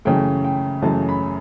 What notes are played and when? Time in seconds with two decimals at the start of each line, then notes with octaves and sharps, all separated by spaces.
0.05 F#2 C#3 E3 A3 G5
0.45 G5
0.82 F#2 C#3 E3 A3 A5
1.09 B5